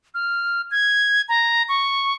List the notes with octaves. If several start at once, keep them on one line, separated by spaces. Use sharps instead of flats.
F6
G#6
A#5
C#6